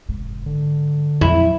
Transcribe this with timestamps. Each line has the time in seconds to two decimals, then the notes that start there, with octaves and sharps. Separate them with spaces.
0.09 F1 G#2
0.46 D3
1.21 F2 A#2 F#3 E4